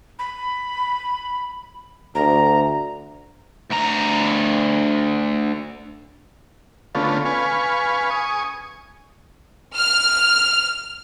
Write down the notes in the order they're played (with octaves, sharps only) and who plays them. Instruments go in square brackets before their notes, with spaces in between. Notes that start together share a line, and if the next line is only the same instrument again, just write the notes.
[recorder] B5
[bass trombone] D2 [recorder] A#5
[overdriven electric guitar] D2 A#5
[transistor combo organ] D3 A3 B3 C#4 F4
B4 F5 G#5 C#6
G#5 C#6 D#6
[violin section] F6